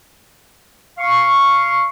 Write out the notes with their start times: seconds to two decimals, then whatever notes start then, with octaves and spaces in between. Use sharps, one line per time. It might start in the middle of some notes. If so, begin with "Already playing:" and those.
0.98 F5 C#6